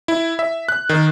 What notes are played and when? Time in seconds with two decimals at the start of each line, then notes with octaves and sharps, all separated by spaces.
0.08 E4
0.39 E5
0.69 F#6
0.89 D#3